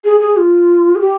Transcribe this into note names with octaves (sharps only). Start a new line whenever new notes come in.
G#4
G#4
F4
G#4
G4